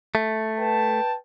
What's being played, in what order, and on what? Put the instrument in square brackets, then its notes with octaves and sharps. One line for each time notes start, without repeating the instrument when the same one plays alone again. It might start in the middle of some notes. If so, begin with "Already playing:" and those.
[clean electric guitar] A3
[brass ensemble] B4 G5 A5